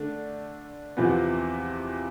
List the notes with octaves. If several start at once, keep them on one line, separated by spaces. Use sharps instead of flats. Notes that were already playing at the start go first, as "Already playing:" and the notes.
Already playing: D3 A3 D4
E2 C3 F3 B3